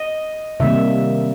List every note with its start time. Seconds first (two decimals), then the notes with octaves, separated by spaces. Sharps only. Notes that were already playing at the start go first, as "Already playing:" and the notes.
Already playing: D#5
0.60 C3 D#3 G3 A#3 E5